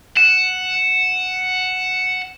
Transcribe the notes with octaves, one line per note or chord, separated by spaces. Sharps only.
F#5 E7